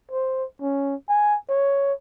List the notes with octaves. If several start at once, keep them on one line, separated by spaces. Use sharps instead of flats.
C5
C#4
G#5
C#5